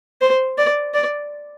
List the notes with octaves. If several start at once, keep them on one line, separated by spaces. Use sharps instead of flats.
C5
D5
D5